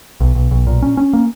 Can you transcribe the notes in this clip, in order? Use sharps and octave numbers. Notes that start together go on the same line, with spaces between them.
B1
B1
B1
A#2
C#4
C#4
A#3